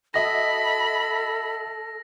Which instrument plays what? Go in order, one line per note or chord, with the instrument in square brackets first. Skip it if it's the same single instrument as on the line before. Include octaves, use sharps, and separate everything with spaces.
[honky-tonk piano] F#4 D#5 E5 [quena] A4 [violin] B5 [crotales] A#6